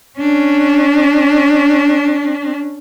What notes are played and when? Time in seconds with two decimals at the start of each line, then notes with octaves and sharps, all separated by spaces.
0.19 C#4 D4